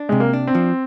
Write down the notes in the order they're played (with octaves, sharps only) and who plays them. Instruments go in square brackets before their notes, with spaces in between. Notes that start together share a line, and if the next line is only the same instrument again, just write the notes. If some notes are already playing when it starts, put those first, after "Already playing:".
Already playing: [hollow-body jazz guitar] D4
[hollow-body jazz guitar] C3 [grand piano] G#3
[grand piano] A#3
[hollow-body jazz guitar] D4
[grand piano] C4
[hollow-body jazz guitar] F3